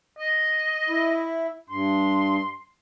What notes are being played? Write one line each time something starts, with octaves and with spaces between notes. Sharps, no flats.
D#5
E4
G2 C6